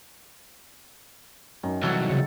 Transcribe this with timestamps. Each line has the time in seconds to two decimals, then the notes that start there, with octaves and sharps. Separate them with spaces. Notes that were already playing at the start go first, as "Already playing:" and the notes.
1.63 F#2 D#3
1.83 C2 E3 F#3 A4 C#5 F#5
2.10 C#3